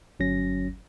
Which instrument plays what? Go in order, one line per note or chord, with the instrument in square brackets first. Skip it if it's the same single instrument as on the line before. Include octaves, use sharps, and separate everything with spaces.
[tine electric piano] G1 F#3 C#4 A#6